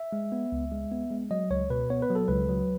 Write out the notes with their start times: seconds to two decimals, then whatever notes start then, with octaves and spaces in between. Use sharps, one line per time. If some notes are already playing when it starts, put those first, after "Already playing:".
Already playing: E5
0.13 G#3
0.32 B3
0.52 C#2
0.72 G#3
0.91 B3
1.11 G#3
1.31 F#3 D#5
1.51 C#2 C#5
1.70 B2 B4
1.90 B3 C#5
2.02 B4
2.10 F#3
2.15 A4
2.28 C#2 B4
2.49 F#3